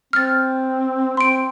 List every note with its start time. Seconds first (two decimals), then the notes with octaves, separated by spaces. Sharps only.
0.13 C4 F6 A6
1.17 C4 C6 D7